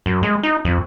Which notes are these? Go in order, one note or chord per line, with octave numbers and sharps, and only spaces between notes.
F#2
G#3
D#4
F2